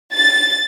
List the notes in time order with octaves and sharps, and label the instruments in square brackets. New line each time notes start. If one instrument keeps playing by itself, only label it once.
[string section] A6